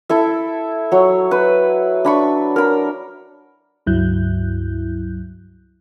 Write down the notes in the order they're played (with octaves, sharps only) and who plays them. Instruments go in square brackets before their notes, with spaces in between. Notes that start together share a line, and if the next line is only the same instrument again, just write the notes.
[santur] E4 A4 E5
F#3 C#5
B4
D4 B5 C#6
A#4 B5
[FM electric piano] C#2 G2 F#3 E4 F#6 G6